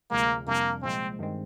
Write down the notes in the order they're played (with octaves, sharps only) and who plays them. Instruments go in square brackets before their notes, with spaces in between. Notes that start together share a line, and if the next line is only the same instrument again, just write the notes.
[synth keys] D2 C3 F3 G#3 [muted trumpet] A#3
[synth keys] F2 C3 G3 D4 [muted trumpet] A#3
[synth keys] C2 A#2 F3 G#3 [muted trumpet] C4
[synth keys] G2 D#3 G#3 C4